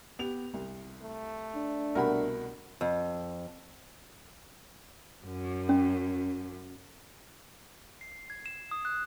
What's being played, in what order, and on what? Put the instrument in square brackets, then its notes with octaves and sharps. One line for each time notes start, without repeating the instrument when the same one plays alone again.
[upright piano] B3 G4 F7
C2
[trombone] A3
[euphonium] D4
[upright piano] C2 B2 B5 [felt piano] A#4 F#5
[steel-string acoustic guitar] F2
[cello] F#2
[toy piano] C#4
[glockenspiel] C7
G#6
E7
D#6
F#6